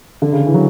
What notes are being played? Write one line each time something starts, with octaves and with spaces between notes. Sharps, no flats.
D3
C#3
D3
E3
F#3